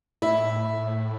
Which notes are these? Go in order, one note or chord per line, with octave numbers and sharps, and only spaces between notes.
A2 E4